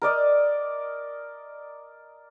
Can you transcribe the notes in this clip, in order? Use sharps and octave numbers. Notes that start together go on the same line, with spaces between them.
A#4 D5 D#5